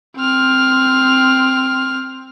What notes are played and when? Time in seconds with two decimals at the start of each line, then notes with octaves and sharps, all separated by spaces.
0.17 C4 F6